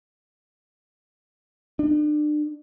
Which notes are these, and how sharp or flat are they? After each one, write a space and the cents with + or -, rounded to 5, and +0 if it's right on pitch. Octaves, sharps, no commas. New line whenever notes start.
D4 +35